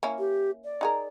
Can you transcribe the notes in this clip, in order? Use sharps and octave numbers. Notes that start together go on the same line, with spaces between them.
A#3 C#4 E4
G4
D5
D#4 G#4 A#4